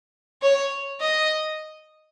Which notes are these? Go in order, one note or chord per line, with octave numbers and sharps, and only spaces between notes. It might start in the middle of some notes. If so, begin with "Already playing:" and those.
C#5
D#5